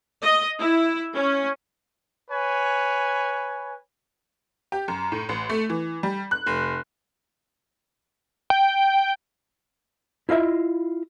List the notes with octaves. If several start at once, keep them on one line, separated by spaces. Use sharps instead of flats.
D#5
E4
C#4
B4 C#5 G#5
G4
F#2
A2
A1
A3
E3
G3
F#6
F1
G5
E4 F4 D#5 E5